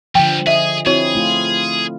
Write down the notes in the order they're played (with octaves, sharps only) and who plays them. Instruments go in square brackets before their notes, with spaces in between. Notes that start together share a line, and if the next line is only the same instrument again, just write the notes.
[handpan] D3 F3 [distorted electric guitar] G3 B3 [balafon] G5
[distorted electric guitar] G#4 [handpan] D#5 [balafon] E5
[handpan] C4 E4 [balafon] F#4 C#5 [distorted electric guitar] G#4
[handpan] A3 F4